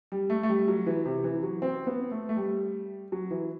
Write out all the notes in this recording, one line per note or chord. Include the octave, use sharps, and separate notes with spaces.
G3
A3
A3
G3
F#3
E3
C3
E3
F#3
C4
B3
A3
A3
G3
F#3
E3